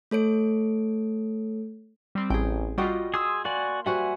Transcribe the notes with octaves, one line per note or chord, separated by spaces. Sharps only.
A3 A4 C#5 D7
G3 C4
A1 G#4 G5
G3 F4 F#4 D#5 G5
G#4 C6 D#6 E6
A#3 F#4 D5 G#5
G3 F#4 C5 E5 F#5 G#5